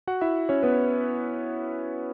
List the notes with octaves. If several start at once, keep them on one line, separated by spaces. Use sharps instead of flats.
F#4 F#5
E4 E5
C#4 C#5
B3 B4